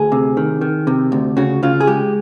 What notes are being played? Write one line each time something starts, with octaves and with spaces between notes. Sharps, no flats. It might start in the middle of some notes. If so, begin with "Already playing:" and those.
Already playing: D2 G#4
C3
D#3
D#3
C3
D2
C#3 F#4
C#3 F4
G#4
G#3 G4